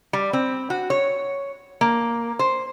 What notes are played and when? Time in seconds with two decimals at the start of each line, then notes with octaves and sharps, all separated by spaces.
0.13 G3
0.33 C4
0.70 F#4
0.90 C#5
1.81 A#3
2.39 C5